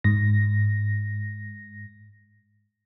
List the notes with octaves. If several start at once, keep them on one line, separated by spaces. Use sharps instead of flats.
G#2 A#6